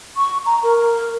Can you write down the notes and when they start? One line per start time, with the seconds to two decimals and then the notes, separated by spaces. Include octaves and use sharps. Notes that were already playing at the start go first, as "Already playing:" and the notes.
0.17 C#6
0.46 A#5
0.63 A#4